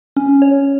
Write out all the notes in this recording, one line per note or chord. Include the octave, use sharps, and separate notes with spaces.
C#4
C#5